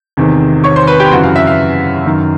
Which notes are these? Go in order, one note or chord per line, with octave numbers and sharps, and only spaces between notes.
E2 C3 D#3
C#5 C#6
C5 C6
B4 B5
G4 G5
F#2 C#3 E3 F#4 F#5
F5
E5
F5
F#2 D#3